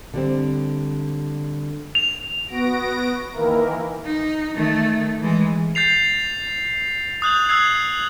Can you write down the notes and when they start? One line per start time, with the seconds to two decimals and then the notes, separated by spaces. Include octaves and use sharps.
0.14 D3 G3 C4
1.95 F7
2.47 B3 F#4 A#6 D7
3.33 D#3 E3 A#3 E4 A#4
4.05 D#4
4.55 D#3 A3
5.21 E3 G#3
5.75 G6 A6 C7 F7
7.22 D#6 F#6 G6 F#7
7.49 D#6 E6 F#6 G#6 C7